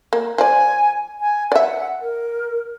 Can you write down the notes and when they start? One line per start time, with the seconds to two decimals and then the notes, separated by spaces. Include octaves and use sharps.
0.13 A#3
0.38 F3 D5 G#5
1.20 G#5
1.52 D5 E5 F#5
2.01 A#4